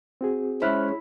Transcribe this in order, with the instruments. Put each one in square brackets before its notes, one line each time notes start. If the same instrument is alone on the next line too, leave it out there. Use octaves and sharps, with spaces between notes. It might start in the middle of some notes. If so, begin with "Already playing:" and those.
[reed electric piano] C4 F#4 G#4
[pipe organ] G#3 C#4 [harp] E4 [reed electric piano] C5 F6 F#6